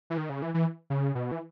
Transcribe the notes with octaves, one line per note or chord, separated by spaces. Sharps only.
E3
D#3
C#3
E3
E3
C#3
B2
E3